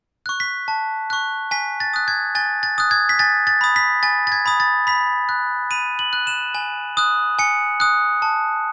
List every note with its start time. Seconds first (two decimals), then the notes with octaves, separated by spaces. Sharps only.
0.26 C#6 F#6
0.40 B6
0.68 A5
1.10 C#6 F#6
1.51 G#5 B6
1.80 A6
1.93 D#6 F#6
2.08 G#6
2.35 G#5 A6
2.63 A6
2.78 D#6 F#6
2.91 G#6
3.09 B6
3.19 G#5 A6
3.47 A6
3.61 B5 D#6
3.76 B6
4.03 G#5 A6
4.27 A6
4.32 G#6
4.46 B5 D#6
4.60 A6
4.87 B5 B6
5.29 F#6
5.71 B5 D#7
5.99 F#7
6.13 F#6
6.27 E7
6.55 G#5
6.97 D#6 F#6
7.39 G#5 C#7
7.80 D#6 F#6
8.22 A5